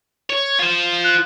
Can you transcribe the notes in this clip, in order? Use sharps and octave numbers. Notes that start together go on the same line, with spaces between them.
C#5
F4 C5
F#6